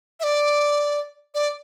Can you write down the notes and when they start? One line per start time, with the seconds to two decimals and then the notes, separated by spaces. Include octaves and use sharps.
0.20 E5
0.23 D5
1.34 D5